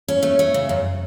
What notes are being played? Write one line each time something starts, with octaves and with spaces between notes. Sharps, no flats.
C#4
A3
A3
C#3
F#2